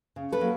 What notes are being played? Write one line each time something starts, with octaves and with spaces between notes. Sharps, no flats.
C#3
A4 B4
F#3 A#3